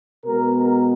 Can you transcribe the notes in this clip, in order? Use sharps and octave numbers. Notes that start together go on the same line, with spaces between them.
B2 G#3 B3 A#4
A#4